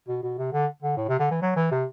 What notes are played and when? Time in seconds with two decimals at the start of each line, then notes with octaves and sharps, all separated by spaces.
0.08 B2
0.23 B2
0.38 C3
0.53 D3
0.83 D3
0.97 A2
1.09 C3
1.19 D3
1.31 E3
1.42 F#3
1.56 E3
1.71 C3